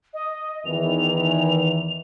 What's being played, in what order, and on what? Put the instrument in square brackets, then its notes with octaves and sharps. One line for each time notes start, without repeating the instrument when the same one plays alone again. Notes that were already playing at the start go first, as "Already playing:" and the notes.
[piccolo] D#5
[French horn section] E2 D#3 E3 [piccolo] F7